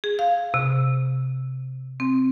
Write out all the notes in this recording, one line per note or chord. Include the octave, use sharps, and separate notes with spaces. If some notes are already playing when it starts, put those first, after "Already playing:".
G#4
F5
C3
C4